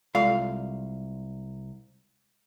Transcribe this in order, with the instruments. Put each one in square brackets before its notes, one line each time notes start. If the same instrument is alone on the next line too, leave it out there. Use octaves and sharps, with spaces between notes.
[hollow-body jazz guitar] C2 F5 [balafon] G#3 F4 A4